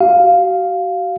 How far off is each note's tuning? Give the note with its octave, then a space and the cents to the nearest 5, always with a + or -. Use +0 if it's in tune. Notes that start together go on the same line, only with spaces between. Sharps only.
F#4 +40 F5 +0